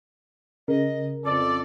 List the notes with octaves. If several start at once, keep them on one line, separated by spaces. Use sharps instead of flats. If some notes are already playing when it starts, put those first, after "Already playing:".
C#3 A#4 D#5
F2 A4 D5 D6